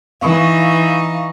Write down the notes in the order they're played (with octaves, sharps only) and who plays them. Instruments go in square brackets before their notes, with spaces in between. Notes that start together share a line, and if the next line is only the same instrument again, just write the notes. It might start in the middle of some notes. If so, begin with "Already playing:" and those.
[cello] E3 D#4 [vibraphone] F5 C#6